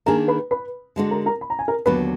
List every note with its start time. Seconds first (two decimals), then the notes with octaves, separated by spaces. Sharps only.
0.06 D#3 A#3 D4 G#4 A#4 A#5
0.28 B4 B5
0.51 B4 B5
0.96 D3 G#3 D4 F#4
1.11 A#4 A#5
1.26 A#4 A#5
1.41 B5
1.50 A#5
1.59 G#5
1.68 A#4 A#5
1.86 D#2 D3 F#3 B3 B4 B5